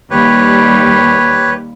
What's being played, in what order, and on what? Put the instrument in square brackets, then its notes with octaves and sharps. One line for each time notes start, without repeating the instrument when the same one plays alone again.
[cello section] D#2 G3 [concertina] G4 B4 C#5